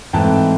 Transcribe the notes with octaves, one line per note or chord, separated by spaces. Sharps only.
G#2 E3 A3 C4 G5 A5